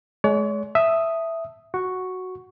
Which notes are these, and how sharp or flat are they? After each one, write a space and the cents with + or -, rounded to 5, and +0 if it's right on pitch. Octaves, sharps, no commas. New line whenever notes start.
G#3 +30 C#5 +45
E5 +0 A5 +0 D#6 +0
F#4 +0 C#6 +0